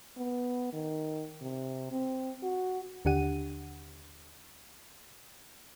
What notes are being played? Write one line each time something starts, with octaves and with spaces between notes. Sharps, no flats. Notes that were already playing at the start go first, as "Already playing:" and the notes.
B3
D#3
C3
C4
F#4
D#2 D3 D4 G4 F#5 D#7